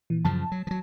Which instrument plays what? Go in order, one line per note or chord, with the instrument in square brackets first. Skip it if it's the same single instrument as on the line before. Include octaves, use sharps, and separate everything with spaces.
[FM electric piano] A#2 E3
[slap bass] F#2 C#3 F3 [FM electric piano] A5
[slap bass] F#3
F3 F#3